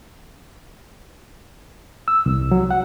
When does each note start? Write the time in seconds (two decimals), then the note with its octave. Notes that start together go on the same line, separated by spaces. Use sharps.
2.08 E6
2.26 C2
2.51 F#3
2.71 F#5